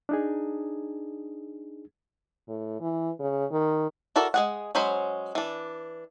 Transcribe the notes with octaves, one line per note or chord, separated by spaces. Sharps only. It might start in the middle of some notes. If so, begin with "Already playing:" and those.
D4 D#4 G#4
A2
E3
C#3
D#3
E4 F#4 A4 A#4 D5
G#3 G#4 F#5
F#3 G#3 C#4 C5 B5
E3 D4